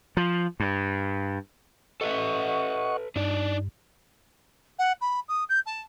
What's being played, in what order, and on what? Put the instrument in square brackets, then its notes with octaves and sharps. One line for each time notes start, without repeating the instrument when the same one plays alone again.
[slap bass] F3
G2
[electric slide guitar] A4 B4 E5 [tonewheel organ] D#5 F#5 C#6
[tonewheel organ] G2 [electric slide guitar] D4 D#4 D5
[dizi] F#5
B5
D#6
G6
A5